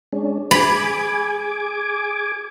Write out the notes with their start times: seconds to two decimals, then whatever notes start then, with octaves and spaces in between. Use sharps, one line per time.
0.13 G#3 C#4 D4
0.51 G#4 G#5 B5 D6